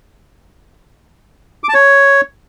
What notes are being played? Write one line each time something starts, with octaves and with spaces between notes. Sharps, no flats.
D6
A5
C#5